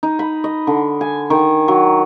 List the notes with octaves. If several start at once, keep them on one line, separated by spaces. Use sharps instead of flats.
D#4
B5
D#5
D3
G#5
D#3
F#3